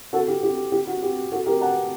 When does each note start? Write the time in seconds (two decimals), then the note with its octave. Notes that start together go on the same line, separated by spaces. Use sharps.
0.13 F#4 A4
0.28 G4
0.43 G4
0.72 G4
0.87 F#4
1.03 G4
1.32 F#4 A4
1.46 G4 A#4
1.61 F#5 A5